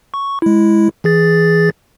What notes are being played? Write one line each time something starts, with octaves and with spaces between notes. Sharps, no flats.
C#6
G#3 E4
E3 G#4 A6